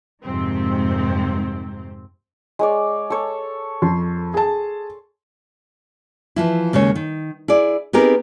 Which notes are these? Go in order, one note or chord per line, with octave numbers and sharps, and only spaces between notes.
F2 G#2 C3 D#3 C4
G#3 C#5 D5
A4 C#5
F2 C6
G#4 A5
E3 F3 E4
D#2 C#3 G#3 C#5
D#3
E4 G#4 D5
B3 C4 D#4 G4 G#4 A#4